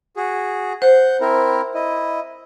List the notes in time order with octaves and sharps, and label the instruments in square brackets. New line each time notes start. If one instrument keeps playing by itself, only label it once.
[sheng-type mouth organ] F#4 G#4
[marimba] C5 [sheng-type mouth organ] F#5 G6
[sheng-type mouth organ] C4 E4 A#4
E4 D#5